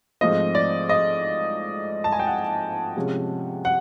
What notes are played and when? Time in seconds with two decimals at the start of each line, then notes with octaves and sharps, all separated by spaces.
0.21 G#2 F3 A3 C4 D#5
0.55 D5
0.89 D#5
2.04 A5
2.12 G#5
2.19 G5
2.27 F#5
2.96 C3 F3 G#3 C#4
3.65 F#5